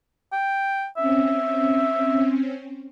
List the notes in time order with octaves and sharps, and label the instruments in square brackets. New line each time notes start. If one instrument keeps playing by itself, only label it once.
[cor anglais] G5
[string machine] C4 C#4 [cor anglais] E5